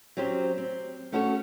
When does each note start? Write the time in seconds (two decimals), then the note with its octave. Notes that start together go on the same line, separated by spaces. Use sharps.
0.17 F#3 C4 C#4 G4 C5
0.58 C4
1.12 A3 C#4 F#4 A4 C5 C#5